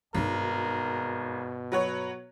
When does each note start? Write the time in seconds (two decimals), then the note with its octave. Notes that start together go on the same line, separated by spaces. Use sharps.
0.14 G#1 G2 B2 D#4 A#4
1.72 F#3 F#4 B4 C#5